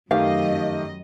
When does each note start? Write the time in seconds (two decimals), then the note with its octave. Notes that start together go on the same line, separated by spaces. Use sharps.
0.11 F#2 D#3 A3 G4 D#5 F5